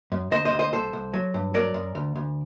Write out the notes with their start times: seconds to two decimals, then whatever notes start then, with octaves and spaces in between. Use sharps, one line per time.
0.12 F#2
0.31 D2 C5 D#5
0.45 C5 D#5
0.53 D2
0.59 C5 D#5
0.73 C2 A4 C5
0.93 C2
1.13 F#3
1.34 G2
1.54 F#3 A#4 D5
1.74 F#2
1.95 D2
2.16 D2